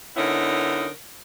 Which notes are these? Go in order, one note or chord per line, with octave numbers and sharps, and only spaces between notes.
D3 B3 C#4 D#4 E4 A#4